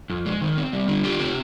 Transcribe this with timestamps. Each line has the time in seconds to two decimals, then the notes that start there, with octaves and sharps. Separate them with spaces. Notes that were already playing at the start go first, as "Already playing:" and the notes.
0.10 F2
0.26 G#3
0.41 D#3
0.57 C4
0.73 G3
0.88 D3
1.04 F4 G4
1.20 C4